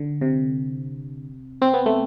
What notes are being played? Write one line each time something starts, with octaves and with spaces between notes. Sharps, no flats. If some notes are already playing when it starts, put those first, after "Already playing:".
Already playing: D3
C3
C4
B3
A3